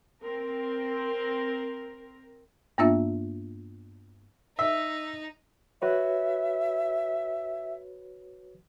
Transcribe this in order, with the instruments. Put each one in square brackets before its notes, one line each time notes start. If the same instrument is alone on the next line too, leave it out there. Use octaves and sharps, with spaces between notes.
[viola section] C4 A#4
[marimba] G2 A#3 B3 D4 F4 E5
[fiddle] D#4 [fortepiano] E5
[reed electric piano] F#4 B4 C#5 [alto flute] E5